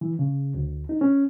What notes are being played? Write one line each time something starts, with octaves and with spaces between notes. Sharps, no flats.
E3
C#3
D2
D#4
C#4